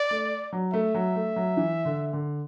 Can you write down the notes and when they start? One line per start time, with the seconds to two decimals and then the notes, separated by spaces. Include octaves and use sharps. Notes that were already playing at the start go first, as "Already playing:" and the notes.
Already playing: D5
0.11 A3
0.53 F#3
0.73 A3 E5
0.95 F#3
1.16 A3
1.36 F#3
1.57 E3
1.85 D3
2.13 D3